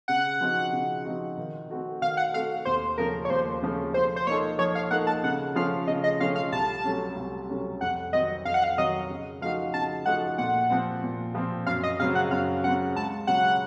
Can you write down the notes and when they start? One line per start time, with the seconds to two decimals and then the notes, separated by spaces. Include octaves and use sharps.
0.08 C#3 F#5
0.41 F3 C4 D#4 F#4
0.72 C#3
1.05 F3 C4 D#4 F#4
1.38 D#3
1.70 A3 C4 F#4 A4
2.01 D#3 F5
2.17 F#5
2.33 A3 C4 F#4 A4 F5
2.65 D#2 C5
2.98 C#3 F3 A3 C#4 A#4
3.25 C#5
3.30 D#2 C5
3.62 C#3 F3 A3 C#4
3.94 F3 C5
4.16 C5
4.27 A#3 D#4 A4 C#5
4.59 F3 C#5
4.75 F5
4.91 A#3 D#4 A4 F#5
5.07 A5
5.24 C#3 F#5
5.56 F3 A3 C#4 F4 F5
5.87 C#3 D#5
6.04 D#5
6.20 F3 A3 C#4 F4 F5
6.35 F5
6.52 C2 A5
6.85 C3 F#3 A3 C#4
7.16 C2
7.48 C3 F#3 A3 C#4
7.81 F2 F#5
8.13 D#3 F#3 C4 D#5
8.45 F2 F5
8.54 F#5
8.64 F5
8.78 D#3 F#3 C4 D#5
9.10 C#3
9.41 F3 A3 D#4 F#4 F5
9.74 C#3 A5
10.06 F3 A3 D#4 F#4 F#5
10.38 A#2 F#5
10.70 F3 C4
11.03 A#2
11.35 F3 C4
11.66 F#2 F5
11.83 D#5
12.00 C#3 F#3 C4 F5
12.15 F#5
12.31 F#2 F5
12.63 C#3 F#3 C4 F#5
12.95 C#2 A5
13.27 C#3 F#3 F#5